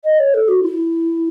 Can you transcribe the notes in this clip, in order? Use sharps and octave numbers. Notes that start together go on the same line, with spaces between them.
D#5
C#5
A4
F#4
E4